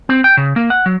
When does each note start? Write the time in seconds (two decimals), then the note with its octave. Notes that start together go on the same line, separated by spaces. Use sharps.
0.09 C4
0.24 G5
0.37 C#3
0.56 A#3
0.70 F#5
0.86 F#3